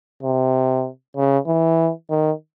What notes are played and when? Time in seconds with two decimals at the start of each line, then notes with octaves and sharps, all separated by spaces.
0.23 C3
1.16 C#3
1.47 E3
2.10 D#3